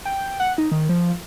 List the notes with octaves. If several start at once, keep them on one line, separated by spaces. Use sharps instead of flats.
G5
F#5
D#4
D#3
F3